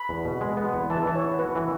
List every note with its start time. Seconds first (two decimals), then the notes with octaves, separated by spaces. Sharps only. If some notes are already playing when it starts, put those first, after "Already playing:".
Already playing: B5
0.09 E2
0.25 B2
0.41 G#3
0.57 B3
0.74 E2
0.90 E3 A5
1.06 E3
1.15 C#5
1.23 B3
1.39 F#4 B4
1.55 E3